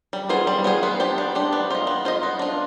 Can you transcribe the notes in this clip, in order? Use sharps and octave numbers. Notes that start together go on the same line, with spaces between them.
G3
B3 F4 G#4 C5
G3
B3 F4 G#4 C5
B3
D4 G4 C5
B3
D4 G4 C5
B3
F4 C5 D#5
B3
F4 C5 D#5
B3
D4 F4